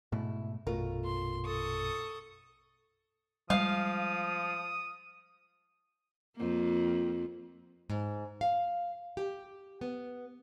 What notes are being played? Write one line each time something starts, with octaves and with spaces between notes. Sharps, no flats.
G#2 B2 A3 E4
A#1 F#2 B2 A3 F4 A#4
C6
A4 C#6 D#6
F3 G3 G#3 F5 D#6
F2 A#3
G#2
F5
G4
B3